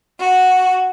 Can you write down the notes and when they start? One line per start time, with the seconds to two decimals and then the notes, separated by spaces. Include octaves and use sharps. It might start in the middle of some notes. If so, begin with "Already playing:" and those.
0.18 F#4